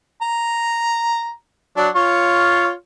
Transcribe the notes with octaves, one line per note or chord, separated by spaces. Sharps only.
A#5
F#3 D4
F4 C#5 C#6